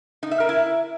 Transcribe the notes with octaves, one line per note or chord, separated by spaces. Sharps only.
D#4
E5
A#4
E4